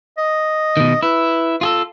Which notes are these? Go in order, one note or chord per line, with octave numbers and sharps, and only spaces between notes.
D#5
B2 D#3
E4 B4
F4 G#4 A4